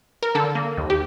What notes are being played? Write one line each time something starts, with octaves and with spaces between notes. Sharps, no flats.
A#4
D3 A4
A#3
D#2
G4